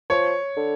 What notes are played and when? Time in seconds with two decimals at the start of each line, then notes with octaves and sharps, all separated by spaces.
0.10 F3 C#5
0.57 D3